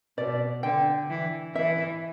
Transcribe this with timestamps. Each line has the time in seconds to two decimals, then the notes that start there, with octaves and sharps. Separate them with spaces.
0.18 B2 D5
0.63 D3 G5
1.10 E3
1.55 E3 E5